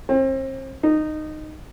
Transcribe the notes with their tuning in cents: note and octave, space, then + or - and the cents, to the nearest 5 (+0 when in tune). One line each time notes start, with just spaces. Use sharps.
C4 +35
D#4 -15